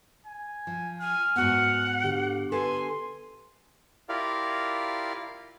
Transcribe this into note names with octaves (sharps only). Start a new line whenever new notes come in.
G#5
F3
G#5 F6
G#2 B3 F#4 F#5 G#5
D3 G4
A4 B4 G#5 C6
E4 F4 G4 A#4 D5 F5